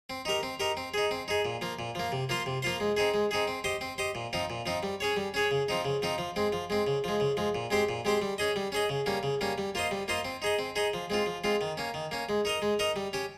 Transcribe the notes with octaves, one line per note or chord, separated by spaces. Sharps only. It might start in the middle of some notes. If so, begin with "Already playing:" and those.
C4
D#4 G4 A#4
C4
D#4 G4 A#4
C4
D#4 G#4
C4
D#4 G#4
A#2
F3 A#3
A#2
F3 A#3
C3
F3 A#3 F4 C5
C3
F3 A#3 F4 C5
G#3
C4 D#4 G#4
G#3
C4 D#4 G#4
C4
G4 C5 D#5
C4
G4 C5 D#5
A#2
F3 C4 D#4
A#2
F3 C4 D#4
G3
C#4 G#4 C#5
G3
C#4 G#4 C#5
C#3
F3 C4 D#4
C#3
F3 C4 D#4
F3
G#3 C4
F3
G#3 C4
C#3
F3 G#3
C#3
F3 G#3
A#2
G#3 C4 G4 C5
A#2
G#3 C4 G4 C5
G3
C#4 G#4 D#5
G3
C#4 G#4 D#5
C#3
G3 A#3 C#4
C#3
G3 A#3 C#4
G3
A#3 F4 C5 D#5
G3
A#3 F4 C5 D#5
C4
D#4 G#4 D#5
C4
D#4 G#4 D#5
F3
G#3 C4 F4
F3
G#3 C4 F4
D#3
A#3 C#4
D#3
A#3 C#4
G#3
D#4 A#4 D#5
G#3
D#4 A#4 D#5
G3
C#4 G4